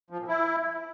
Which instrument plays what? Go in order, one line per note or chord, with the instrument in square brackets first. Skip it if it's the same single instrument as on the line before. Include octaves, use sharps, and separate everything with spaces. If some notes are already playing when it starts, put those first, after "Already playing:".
[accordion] F3
A#2
E4